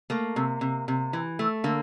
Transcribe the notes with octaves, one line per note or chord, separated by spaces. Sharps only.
A3 A#3
C3
C3
C3
E3
A3
D3 A#3